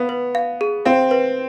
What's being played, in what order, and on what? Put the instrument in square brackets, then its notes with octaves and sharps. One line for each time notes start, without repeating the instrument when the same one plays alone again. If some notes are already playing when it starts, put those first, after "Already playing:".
Already playing: [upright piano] B3 [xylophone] F5
[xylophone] B4
F5
G#4
[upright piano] C4 [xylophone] F5
[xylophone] B4